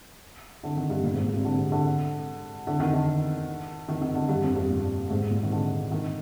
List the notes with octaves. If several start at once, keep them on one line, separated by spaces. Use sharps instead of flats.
D3
D#3
G2
A#2
G#2
A#2
C3
D3
C3
D3
D3
D#3
D3
D#3
D#3
D3
G2
F2
G2
A#2
G#2
A#2
D#3
D3
D#3